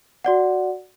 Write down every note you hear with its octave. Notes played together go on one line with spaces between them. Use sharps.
F#4 D5 F#5